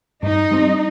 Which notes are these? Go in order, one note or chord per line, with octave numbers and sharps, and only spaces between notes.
G2 D#4
G3 C4